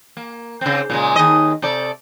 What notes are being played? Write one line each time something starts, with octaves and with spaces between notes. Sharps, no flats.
A#3
C#3 C4
A#2 C#3 G#3
D#2 D#5
C3 A4 D5